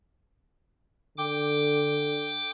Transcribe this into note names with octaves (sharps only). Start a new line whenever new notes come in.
D3 G5 D6